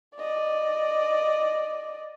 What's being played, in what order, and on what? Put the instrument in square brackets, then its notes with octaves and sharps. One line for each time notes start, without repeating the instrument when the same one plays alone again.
[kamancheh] D5 D#5